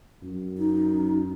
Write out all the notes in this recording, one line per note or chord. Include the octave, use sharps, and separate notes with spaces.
F#2
D#4